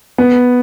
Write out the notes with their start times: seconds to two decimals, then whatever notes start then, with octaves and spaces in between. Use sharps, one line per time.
0.18 B3